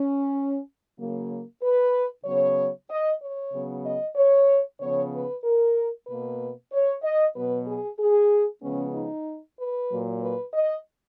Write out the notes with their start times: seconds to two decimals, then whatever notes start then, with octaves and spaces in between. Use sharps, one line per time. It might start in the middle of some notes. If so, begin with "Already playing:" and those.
Already playing: C#4
0.98 C#3 F#3 A#3
1.62 B4
2.25 C#3 F#3 B3 C#5
2.90 D#5
3.21 C#5
3.53 C#3 F#3 B3
3.85 D#5
4.16 C#5
4.80 C#3 F3 B3 C#5
5.13 B4
5.44 A#4
6.07 B2 A#3 B4
6.72 C#5
7.03 D#5
7.35 B2 F#3 B3 B4
7.67 G#4
7.99 G#4
8.62 C#3 F3 G#3 B3 C#4
8.94 D#4
9.58 B4
9.90 A#2 F#3 A#3
10.22 B4
10.53 D#5